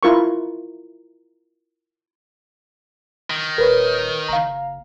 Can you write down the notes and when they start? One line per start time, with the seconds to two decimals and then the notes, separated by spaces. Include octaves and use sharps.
0.03 E4 F4 A#4 C#6
3.30 D#3
3.58 D#1 A#4 B4 C#5
4.28 F#1 F5 A#5